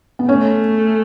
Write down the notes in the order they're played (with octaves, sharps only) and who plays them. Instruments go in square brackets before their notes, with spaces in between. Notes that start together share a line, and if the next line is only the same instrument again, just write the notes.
[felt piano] B3
[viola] A3 [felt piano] C#4